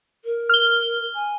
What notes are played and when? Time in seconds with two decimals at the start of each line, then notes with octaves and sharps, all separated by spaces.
0.24 A#4
0.49 F6 G7
1.14 G#5